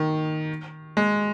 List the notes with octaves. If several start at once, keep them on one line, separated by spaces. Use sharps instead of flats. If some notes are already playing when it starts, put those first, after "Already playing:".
Already playing: D#3
G#3